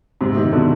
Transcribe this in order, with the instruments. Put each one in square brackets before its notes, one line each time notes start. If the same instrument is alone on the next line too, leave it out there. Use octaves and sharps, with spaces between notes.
[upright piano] G#2 C3
C3 D#3
B2 D3